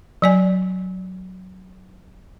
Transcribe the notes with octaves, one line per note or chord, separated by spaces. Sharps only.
F#3 D5 G#5